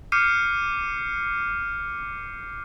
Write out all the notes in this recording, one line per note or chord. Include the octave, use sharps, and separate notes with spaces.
D6 F6 G6 C7 C#7 D#7